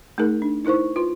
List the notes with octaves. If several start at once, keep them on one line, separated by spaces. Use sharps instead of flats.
A3 D#4 G#4 A#4
D4
D#4 E4 A#4 C5 C#6
F4 B4 C6